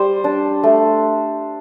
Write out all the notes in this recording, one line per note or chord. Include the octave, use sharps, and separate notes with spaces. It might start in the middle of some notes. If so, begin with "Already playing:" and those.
Already playing: G3 C5
D4
A3